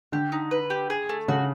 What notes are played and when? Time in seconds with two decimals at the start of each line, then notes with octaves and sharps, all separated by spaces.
0.12 D3 G4
0.32 D#4
0.51 B4
0.70 G4
0.90 G#4
1.09 A3
1.28 C#3 F#4